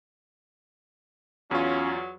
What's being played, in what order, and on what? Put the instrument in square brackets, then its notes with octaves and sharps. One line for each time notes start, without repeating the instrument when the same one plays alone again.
[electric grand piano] E2 F4 [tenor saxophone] F#3 [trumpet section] C#4